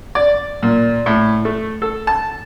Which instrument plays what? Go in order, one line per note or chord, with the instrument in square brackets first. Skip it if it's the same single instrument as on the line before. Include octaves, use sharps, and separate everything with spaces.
[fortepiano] D5
A#2
A2
A3
A4
A5